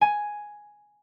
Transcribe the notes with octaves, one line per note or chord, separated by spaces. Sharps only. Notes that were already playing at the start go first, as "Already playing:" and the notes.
G#5